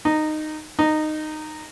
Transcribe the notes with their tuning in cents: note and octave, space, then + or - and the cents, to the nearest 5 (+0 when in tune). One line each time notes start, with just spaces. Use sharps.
D#4 -15
D#4 -15